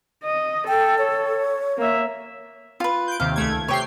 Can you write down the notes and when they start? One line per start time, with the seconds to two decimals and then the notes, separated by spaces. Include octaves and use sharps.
0.24 D#5
0.68 A4 G5
0.98 C#5
1.78 A#3 E5
2.80 F4 B4
3.08 G6 D7
3.20 D#2 C3 D#3 F5
3.35 C#2 A3 G#6
3.68 C3 G4 C#5 G5 C7